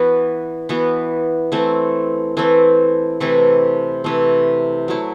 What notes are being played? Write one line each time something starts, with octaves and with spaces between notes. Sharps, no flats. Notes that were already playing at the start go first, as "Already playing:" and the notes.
Already playing: E3 B3 F#4 B4
E3 B3 F#4 B4
E3 A3 C4
E3 A3 C4
C3 E3 A3 C4
C3 E3 A3 C4
F#3 A3 E4